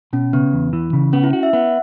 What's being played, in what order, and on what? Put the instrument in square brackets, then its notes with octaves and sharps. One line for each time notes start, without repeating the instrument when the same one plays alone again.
[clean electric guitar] B2 [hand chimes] C#4
[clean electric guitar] C#3 [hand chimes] B3
[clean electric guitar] E2
E3
C#3
[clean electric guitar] B3 [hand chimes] C#4
[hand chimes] E4
[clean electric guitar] F#4
[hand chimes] E5
[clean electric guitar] B3 [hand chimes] F#5